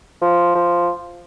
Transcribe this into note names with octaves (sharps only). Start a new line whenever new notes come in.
F3
F3